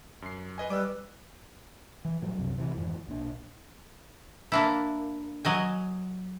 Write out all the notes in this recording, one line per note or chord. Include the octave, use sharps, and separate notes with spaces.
F#2 C7
B4 D#5 G#5
G3 B4 D6 E6
E3
A2 F3 F#3
C2 F#2 C3
A1 C3 D#3 E3
F2 G#2 D#3 E3
B1 A#2 D4
A#3 D4 E4
F#3 D#5 G#5